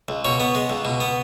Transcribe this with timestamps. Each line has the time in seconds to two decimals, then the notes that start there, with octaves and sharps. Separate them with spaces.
0.08 C#2
0.25 B2 C#5
0.40 B3
0.55 G#3
0.70 C#2
0.85 B2
1.00 B3